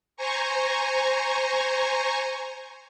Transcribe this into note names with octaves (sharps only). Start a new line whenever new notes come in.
C5 G#5 A#5 C#6